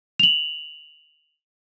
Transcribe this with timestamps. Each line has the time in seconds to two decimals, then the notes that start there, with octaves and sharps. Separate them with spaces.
0.20 F7 F#7